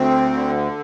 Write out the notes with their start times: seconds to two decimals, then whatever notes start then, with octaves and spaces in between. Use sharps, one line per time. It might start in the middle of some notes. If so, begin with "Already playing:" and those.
Already playing: D2 C4
0.33 D3